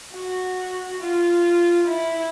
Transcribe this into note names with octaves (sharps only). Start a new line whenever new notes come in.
F#4
F4
E4